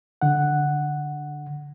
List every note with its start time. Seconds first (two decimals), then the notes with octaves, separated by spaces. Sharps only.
0.22 D3 F#5